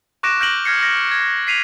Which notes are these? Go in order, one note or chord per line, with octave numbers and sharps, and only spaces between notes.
C#6 D6 F#6 A#6 D7 E7
F6 G6 A#6 D7 F#7 G7
F6 G6 G#6 A#6 C7 C#7
F6 A#6
G#6
B6 C7 D#7 F7